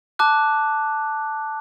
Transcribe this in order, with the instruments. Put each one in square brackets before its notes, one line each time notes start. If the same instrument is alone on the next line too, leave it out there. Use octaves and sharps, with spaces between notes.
[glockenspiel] A5 D6 F#6